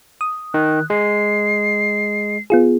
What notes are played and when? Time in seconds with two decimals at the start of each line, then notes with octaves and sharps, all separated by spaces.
0.21 D#6
0.54 D#3 F#6
0.90 G#3 C7
2.50 B3 F4 G#4